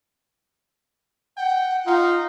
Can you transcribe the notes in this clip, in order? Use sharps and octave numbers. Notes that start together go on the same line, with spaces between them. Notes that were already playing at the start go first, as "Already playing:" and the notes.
F#5 G5
D#4 F4